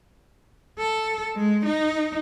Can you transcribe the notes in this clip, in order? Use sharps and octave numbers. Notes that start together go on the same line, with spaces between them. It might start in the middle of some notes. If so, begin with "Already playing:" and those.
A4
G#3
D#4